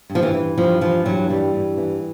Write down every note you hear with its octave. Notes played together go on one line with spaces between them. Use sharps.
G2
F3
E3
E3
G2 F3
E3 F3
G2 F#3
E3 G3
G2
E3